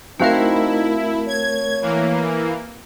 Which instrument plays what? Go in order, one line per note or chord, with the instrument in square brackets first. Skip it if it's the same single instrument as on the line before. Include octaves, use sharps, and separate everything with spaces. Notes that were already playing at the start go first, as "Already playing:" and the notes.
[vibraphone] A3 A#4 [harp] C4 F#4 F5 [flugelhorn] D#4 [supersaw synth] E4
[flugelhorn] C#5 [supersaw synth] G#6
[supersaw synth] E3 A#3